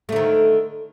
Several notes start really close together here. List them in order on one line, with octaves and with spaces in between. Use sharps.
A3 D3 D#3